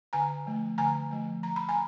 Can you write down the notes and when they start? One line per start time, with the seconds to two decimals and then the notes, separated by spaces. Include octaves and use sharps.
0.13 D3 G#5 A#5
0.46 F3 A3
0.78 D3 G#5 A#5
1.11 F3 A3
1.43 F3 A#5
1.56 B5
1.69 G#5 A#5